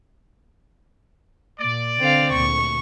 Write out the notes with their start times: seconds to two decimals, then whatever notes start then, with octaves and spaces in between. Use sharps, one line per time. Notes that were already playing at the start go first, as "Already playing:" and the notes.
1.59 A#2 D5
2.00 D3 C4 F5
2.32 D2 A#2 C#6